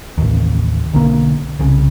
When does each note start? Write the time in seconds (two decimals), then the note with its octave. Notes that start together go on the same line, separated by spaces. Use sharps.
0.18 A1 D#2
0.93 B1 D3 A#3
1.59 C2 C#3